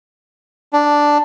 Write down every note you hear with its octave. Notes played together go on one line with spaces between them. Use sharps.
D4